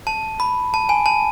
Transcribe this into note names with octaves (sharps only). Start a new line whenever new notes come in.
A5
B5
A5
G#5
A5